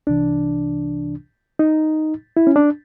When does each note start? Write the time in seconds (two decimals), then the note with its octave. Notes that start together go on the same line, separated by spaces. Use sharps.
0.07 C2 C3 E3 D4
1.59 D#4
2.37 E4
2.47 C#4
2.56 D4